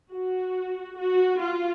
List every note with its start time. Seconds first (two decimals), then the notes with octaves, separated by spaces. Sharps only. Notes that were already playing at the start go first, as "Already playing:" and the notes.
0.11 F#4
0.98 F#4
1.41 F4